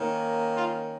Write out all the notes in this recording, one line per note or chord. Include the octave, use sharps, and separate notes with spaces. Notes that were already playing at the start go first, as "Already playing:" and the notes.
Already playing: D#3 A#3 C#4
F4